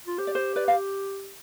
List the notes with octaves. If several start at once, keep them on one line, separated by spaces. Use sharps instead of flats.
F4
G4 C5
D5
C5
B4 D5
F5